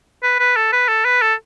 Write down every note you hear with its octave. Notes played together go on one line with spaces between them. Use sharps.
B4
B4
A4
B4
A4
B4
A4